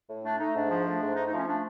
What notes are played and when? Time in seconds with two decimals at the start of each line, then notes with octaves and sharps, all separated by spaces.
0.09 A2
0.24 A3 D4
0.39 A3 D#4
0.55 G#2 D4
0.70 F3
0.86 A3
1.01 G#2
1.16 A3 D#4
1.27 D#4
1.32 F3 C#4
1.47 A3 D4